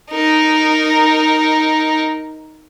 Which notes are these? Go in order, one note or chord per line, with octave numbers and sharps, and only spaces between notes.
D#4 A#4